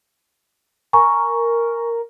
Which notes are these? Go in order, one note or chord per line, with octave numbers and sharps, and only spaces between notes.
A#4 G#5 A#5 C#6